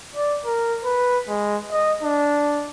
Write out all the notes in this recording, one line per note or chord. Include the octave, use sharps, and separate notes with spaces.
D5
A#4
B4
G#3
D#5
D4